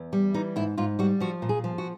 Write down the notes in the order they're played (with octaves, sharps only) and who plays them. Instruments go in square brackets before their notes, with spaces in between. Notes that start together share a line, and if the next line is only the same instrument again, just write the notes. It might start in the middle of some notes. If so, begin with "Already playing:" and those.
Already playing: [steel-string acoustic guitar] E2
G3
E3 D#4
G#2 E4
G#2 F4
G3 F#4
F3 F#4
A#2
G#4
F3
F#4